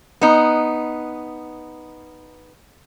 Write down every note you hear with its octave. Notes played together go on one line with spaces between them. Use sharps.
B3 D#4